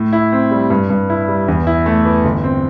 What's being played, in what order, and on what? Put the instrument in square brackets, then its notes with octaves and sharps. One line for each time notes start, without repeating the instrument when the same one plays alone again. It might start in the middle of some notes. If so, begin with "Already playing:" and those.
Already playing: [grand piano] A2
E4
C4
G3
G2
G2
E4
G3
E2
E4
A3
E3
G1
C4